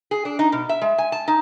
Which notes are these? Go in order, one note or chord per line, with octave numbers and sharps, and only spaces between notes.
G#4
D4
D#4
B2
E5
G#3
G#5
A5
D#4